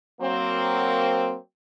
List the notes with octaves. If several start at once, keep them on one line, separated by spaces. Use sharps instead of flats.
F#3 A#3 C4